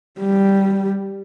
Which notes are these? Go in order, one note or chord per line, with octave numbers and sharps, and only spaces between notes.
G3